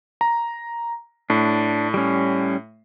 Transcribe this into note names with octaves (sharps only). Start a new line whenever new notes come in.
A#5
A2 D4
G3 C#4